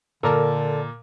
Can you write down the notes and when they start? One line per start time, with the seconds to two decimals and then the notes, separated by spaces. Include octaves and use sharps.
0.23 A#2 D3 A4 A#4 D5 A5